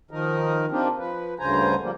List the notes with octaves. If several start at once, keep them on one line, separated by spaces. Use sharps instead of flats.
D#3 F3 D#4 A#4
A#3 C4 D4 D#4 F4 G4
F3 B4
D2 G2 C#3 C5 G#5 A#5
F3 G3 A#3